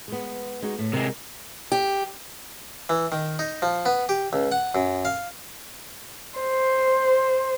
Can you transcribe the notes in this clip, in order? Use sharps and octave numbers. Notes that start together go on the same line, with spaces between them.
G#3 B3
G#3 D#4 F#4
A2
C3 G#3 A#4
G4
E3
D#3
D#4
F3
B3
G4
C#2
F#5
F#2
F5
C5